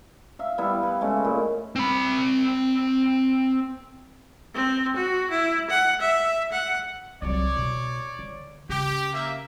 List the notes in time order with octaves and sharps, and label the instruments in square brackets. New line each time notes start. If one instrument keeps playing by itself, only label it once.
[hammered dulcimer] E5 F5
G3 B3 E4 F5
B4
C#3 G#3 A3
A#2
[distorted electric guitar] C4 B5
[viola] C4
F#4
E4
F#5
E5
F#5
[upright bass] C2 F#3 [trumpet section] C#5 D5
[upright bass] B2
D3
[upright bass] C#3 [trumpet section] G4
[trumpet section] A#3 E5